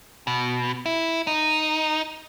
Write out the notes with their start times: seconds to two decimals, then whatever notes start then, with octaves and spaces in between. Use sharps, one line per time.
0.27 B2
0.86 E4
1.27 D#4